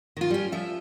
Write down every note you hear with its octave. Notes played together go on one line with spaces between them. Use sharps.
D#3 F4
G3 C#4
F3 E5